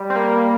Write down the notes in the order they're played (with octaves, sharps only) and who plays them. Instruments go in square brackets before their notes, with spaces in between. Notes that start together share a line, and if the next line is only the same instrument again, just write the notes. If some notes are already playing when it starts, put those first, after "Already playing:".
Already playing: [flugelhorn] G3
[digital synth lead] C4
A#3